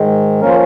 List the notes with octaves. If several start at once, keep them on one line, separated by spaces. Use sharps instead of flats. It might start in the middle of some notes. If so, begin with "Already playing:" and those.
Already playing: G#2 D#3 G#3
F3 A#3 C#4 A#4
C5